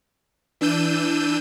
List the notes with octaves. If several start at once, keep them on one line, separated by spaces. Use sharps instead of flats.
E3 D4 E6 G6 D#7